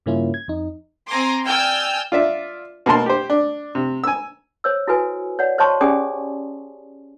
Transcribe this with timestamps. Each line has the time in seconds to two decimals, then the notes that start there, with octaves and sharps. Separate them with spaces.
0.06 G2 C#3 A#3 C#4 E4 F4
0.34 G#6
0.48 F2 D#4
1.08 C4 G#5 A#5 C6 D6
1.45 D5 G5 G#5 E6 F6 G6
2.12 F4 D5 E5
2.86 B2 A#3 A#4 A5 C6
3.06 G4 C5
3.30 D4
3.75 C3
4.04 G#5 E6
4.64 C5 C#5 E6
4.87 E4 F#4 A4 B4 G#5
5.39 C#5 D5 F#5
5.58 C5 C#5 D#5 A5 C6 C#6
5.81 C#4 G4 G#4 D5 G#5 D#6